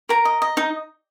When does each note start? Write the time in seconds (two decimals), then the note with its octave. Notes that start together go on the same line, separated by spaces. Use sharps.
0.09 A#4 A#5
0.25 D#5
0.42 D#5
0.57 D#4